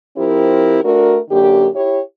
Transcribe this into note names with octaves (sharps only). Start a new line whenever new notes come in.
F3 C4 E4 G4 A#4
A3 D4 F#4 A#4
F#2 D3 A#3 G4
E4 G4 C#5